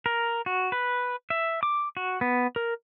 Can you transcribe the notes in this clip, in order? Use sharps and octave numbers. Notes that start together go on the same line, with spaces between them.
A#4
F#4
B4
E5
D6
F#4
B3
A#4